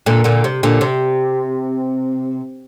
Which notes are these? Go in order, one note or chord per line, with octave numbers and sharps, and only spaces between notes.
A#2 D3
A#2 D3
C3
A#2 D3
C3